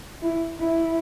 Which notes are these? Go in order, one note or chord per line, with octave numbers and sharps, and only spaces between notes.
E4
E4